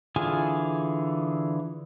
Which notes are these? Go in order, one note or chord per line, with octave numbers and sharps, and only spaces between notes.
D3 E3 F4 G#4 G#5